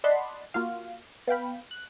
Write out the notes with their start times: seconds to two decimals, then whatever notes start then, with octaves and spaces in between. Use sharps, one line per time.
0.04 D5 D#5 F#5 A5 B5 C6
0.54 A#3 F4 F#4 F5
1.27 B3 F5 G5 B5
1.71 F#6